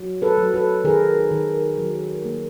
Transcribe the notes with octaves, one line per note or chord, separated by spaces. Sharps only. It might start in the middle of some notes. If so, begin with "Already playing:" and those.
Already playing: F#3
A4 B4
F#3
A4 B4
D#3 G#4 A#4
D#3
F#3
A#3